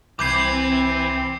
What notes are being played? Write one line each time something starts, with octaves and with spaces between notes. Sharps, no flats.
C2 E3 C4 B4 D6 G6 G#6 C7